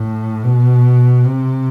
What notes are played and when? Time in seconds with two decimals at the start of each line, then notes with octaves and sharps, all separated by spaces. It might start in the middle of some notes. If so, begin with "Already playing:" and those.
Already playing: A2
0.43 B2
1.26 C3